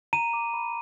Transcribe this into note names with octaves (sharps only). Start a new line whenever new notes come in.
A#5 D#7
D6
B5